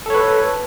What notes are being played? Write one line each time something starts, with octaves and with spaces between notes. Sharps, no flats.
A4 B4 C#5